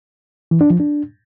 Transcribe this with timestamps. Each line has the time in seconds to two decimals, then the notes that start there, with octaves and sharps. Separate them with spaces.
0.51 E3
0.61 D4
0.70 F3
0.80 D4